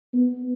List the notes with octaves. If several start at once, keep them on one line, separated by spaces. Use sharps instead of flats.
B3